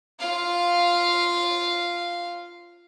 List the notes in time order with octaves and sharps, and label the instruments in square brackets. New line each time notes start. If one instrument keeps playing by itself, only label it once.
[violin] F4 F5